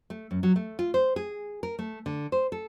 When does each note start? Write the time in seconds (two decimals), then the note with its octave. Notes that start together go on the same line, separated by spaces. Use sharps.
0.10 A3
0.31 F#2
0.43 F#3
0.56 A3
0.79 F4
0.94 C5
1.16 G#4
1.63 A#4
1.79 A3
2.06 D3
2.32 C5
2.52 A4